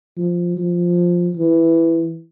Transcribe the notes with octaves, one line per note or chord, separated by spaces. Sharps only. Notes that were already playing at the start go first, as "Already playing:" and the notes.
F3
F3
E3